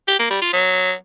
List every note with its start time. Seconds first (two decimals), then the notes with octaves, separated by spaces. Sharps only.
0.08 G4
0.19 A#3
0.30 G3
0.42 F4
0.53 F#3